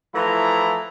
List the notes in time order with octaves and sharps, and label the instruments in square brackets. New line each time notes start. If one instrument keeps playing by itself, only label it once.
[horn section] E3 F3 A3 E4 A#5